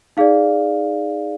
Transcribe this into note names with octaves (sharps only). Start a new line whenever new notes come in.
D#4 G#4 D5 F5